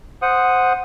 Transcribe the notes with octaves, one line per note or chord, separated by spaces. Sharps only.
C5 F#5 D#6